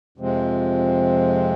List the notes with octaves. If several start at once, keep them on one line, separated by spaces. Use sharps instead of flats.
F2 C3 F3 G#3 C4